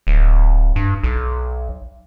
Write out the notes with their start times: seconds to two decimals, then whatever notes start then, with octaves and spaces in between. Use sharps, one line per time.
0.07 D1
0.76 G2
1.03 B1